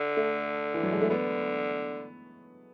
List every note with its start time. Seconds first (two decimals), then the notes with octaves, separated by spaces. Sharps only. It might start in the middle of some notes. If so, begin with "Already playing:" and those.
Already playing: D3
0.17 A3
0.74 E3
0.83 F#3
0.92 G#3
1.01 A3
1.10 D3 B3